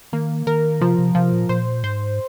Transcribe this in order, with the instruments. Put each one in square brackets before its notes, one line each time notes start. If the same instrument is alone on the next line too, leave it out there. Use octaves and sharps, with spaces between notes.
[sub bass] D#3 [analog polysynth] A#3
[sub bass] D#3 [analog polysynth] A#4
[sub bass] C3 [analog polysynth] F3
[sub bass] C3
[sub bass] C3 [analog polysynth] F3
[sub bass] A#2
[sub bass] A#2 [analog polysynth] C5
[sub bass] G#2 [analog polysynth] C5